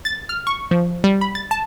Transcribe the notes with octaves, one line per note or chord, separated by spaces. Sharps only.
A6
F6
C#6
F3
G3
B5
A6
A5